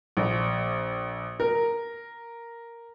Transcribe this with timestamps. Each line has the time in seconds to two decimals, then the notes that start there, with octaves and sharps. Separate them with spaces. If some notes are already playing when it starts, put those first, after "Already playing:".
0.17 A#1
1.40 A#4